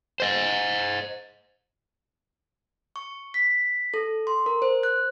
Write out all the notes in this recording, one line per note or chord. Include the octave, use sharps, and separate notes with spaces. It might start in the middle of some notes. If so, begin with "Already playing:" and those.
C5 D#5
C#6
B6
A4
C6
A#4
C5
F#6